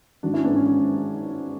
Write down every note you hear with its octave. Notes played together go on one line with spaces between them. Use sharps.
G#1 D4 F#4
C#4 E4
G#2 E3 G#3 B3 D4
C#4
C#4